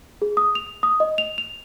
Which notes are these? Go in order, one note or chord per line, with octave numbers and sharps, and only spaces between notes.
G#4
D#6
F7
D#6
D#5
F7
F7